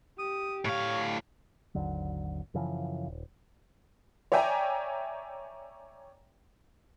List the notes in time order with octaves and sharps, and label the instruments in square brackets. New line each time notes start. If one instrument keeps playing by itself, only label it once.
[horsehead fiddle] G4 [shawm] D#6
[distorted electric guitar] A2 F5 [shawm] C#5
[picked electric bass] G#1 D#2 D3 F#3
F#2 C#3 E3 F3
D#1
[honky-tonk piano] C#5 D5 E5 G5 G#5 A#5